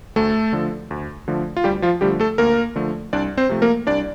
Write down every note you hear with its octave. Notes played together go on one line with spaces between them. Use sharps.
D2 A3 A4
D3 F3 A3
D2
D3 F3 A3
F4
D2 G3 G4
F3 F4
D3 F3 G3 A3 G4
A3 A4
D2 A#3 A#4
D3 F3 A3
C2 D4 D5
C4 C5
C3 F3 A3
A#3 A#4
C2 D4 D5